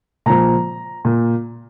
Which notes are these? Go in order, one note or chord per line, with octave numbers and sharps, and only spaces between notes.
A#2 F3 A#5
A#2